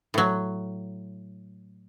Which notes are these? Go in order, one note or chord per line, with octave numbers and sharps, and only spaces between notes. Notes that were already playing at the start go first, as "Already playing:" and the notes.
A2 F#3